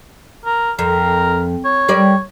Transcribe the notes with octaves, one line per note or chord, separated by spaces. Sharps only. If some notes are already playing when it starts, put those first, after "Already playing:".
A#4
F2 A#4
C#5
G3 A#4 D5